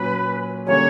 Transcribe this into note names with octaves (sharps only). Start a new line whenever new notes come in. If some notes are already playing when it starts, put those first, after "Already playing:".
Already playing: A#2 F#3 C#4 B4
D3 G3 A#3 C#4 C#5